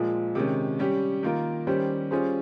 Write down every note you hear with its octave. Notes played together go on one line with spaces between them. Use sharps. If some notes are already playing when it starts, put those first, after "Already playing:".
Already playing: A#2 F3 G#3
C3 D#3 G#3 C#4
G3 C#4 G4
D#3 A#3 F4 A#4
D#3 G3 C#4 G4 C5
G3 C#4 F4 G#4 C5